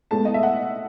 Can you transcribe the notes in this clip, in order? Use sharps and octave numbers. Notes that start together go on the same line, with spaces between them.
A2 G#3 B3 A5
D#5
E5
F#5